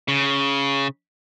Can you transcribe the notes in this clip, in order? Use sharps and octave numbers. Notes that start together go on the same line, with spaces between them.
C#3